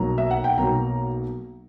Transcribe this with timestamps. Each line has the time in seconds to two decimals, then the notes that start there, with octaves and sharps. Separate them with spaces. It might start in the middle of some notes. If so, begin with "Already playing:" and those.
Already playing: B1 B2 F#3 A#3 A#5
0.18 E5
0.31 F#5
0.44 G5
0.58 B1 B2 F#3 A#3 A#5